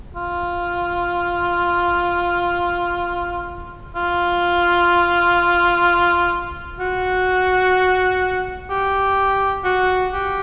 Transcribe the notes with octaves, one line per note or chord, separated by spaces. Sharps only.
F4
F4
F#4
G4
F#4
G4